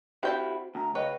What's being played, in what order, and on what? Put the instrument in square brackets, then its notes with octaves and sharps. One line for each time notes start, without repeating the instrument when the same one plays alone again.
[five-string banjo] C4 G5 A5 [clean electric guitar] E4 F#4 G4
[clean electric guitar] D2 [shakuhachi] A#5
[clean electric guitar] C#3 B4 [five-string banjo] C#5 [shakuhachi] D#5